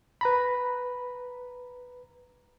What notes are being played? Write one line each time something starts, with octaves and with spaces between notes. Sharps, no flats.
B4 A#5 B5